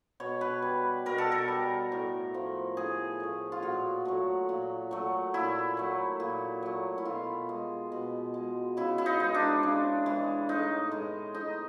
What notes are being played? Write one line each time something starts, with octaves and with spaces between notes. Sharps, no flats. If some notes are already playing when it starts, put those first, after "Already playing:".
B2 C#5
B4
G3
B2 A#4
A4
A#4
G3
A2
F3 A3
A2 G#4
F3 A3
F4
A#2 F#4
F#3 A3
A#2
F#3 A3
A#2 E4
F#3 A3
A#2
F#3 A3
E4
B2 F4
G#3
B2
G#3
C#3 E4
E4
D#4
E3 G#3
D4
C#3
E3 G#3
A2 D#4
E3 G#3
A2 D#4